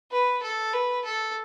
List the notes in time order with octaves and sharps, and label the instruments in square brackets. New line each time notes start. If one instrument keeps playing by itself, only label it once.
[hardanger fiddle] B4
A4
B4
A4